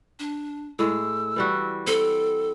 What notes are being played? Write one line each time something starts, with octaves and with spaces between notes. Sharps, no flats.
D4
A2 G#3 E6
E3 G3 F#4
C4 A4